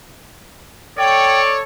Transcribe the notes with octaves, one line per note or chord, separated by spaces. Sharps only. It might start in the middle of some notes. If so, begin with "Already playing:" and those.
A4 C#5 D5 G5